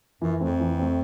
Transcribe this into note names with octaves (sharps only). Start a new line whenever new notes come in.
F#2 E3
F2 A3 C4
E3
A3 C4